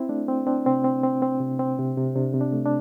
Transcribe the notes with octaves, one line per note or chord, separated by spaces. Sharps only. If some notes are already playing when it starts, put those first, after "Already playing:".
Already playing: C4 E4
A3 D4
C4
C4 D4
C3 C4
C4
C4
C4
C3
C4
C3
C3
C3 D4
C3
D4
A3
D4